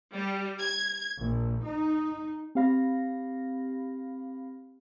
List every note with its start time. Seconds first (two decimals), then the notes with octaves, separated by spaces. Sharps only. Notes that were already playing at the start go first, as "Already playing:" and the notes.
0.13 G3
0.58 G#6
1.19 A#1
1.64 D#4
2.55 C4 G4 F5 B5 A#6